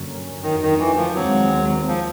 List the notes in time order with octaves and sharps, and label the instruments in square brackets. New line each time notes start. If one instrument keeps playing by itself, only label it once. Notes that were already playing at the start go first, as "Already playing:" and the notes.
Already playing: [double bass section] G2 D3 F#3 A#3 C#4
[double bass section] F2 D3 F#3 A3 [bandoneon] D#3
[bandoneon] D#3
E3
F3
[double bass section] D#2 D#3 G#3 C4 [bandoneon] F#3
[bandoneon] F3